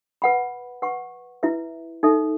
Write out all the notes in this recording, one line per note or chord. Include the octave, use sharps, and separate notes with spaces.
B4 F#5 B5
B4 F#5 C#6
E4 B4 E5
D#4 A4 E5